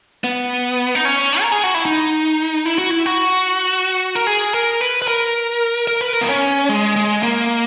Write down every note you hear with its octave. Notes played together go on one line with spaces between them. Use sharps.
B3
D#4
C#4
A#4
G#4
F#4
E4
D#4
E4
F#4
E4
F#4
A#4
G#4
A#4
B4
B4
A#4
A#4
B4
A#4
B3
C#4
G#3
G#3
A#3